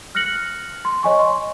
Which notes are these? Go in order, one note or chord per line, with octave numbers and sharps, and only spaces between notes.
F6 F#6 A#6 C#7 F#7
C6
C#5 D#5 G#5 C#6
C6